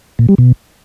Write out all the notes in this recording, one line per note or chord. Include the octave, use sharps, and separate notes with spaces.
A#2
G3
B2